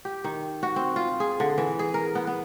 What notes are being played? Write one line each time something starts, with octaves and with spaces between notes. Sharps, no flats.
G4
D#3
F#4
C4
F4
G#4
D3
E3
G#4
A#4
B3
B3